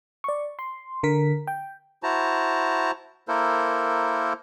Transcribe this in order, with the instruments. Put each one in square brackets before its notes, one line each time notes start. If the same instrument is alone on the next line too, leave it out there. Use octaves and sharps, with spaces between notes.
[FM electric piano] D5 C#6
C6
D3 A#4 B6
G5
[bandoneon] E4 F#4 C5 A5 A#5
A#3 E4 A4 A#4 C5